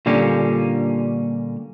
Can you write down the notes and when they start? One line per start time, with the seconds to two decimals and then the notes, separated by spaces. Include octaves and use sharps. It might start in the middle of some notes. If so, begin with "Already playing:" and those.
0.06 A#2 D3 G3 A#3 C#4